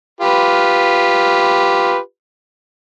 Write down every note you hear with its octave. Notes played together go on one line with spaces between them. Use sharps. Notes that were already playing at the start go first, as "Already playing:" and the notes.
F4 G4 B4